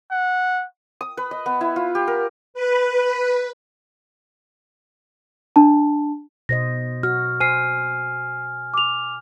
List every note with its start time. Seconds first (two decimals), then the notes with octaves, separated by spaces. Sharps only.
0.11 F#5
1.01 D#6
1.17 B4
1.31 D#5
1.46 B3
1.61 E4
1.76 F4
1.95 G4
2.07 A#4
2.54 B4
5.56 D4 A5
6.49 B2 C5 D#5 A#6
7.03 F#4 F6
7.40 C5 G#5 F6 C7 D#7
8.74 D6 F7